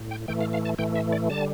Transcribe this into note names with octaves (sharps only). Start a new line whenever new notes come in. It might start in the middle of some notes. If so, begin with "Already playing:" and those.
Already playing: A2
G5
A2 E3 A3 G5
F5
F5
A5
A2 E3 A3 G5
E5
D5
D3 G3 A5